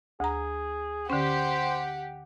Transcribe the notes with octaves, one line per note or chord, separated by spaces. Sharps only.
D2 G#4 A#5
D3 C#4 G4 C5 F#5